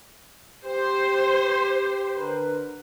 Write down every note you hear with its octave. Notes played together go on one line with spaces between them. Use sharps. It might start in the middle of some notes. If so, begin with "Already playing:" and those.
G4 C5
D3 A#4 B4